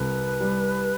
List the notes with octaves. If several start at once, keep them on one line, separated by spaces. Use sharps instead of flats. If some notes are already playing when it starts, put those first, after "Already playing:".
Already playing: C2 B4
G3